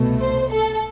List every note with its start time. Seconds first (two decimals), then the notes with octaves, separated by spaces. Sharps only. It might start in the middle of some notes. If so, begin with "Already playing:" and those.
Already playing: C2 B2 A3
0.20 C5
0.52 A4